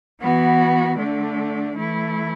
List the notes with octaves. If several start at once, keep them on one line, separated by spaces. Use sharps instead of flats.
E3 B3 F#4
D3 A3 D4
E3 A3 E4